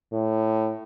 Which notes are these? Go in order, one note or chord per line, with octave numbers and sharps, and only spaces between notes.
A2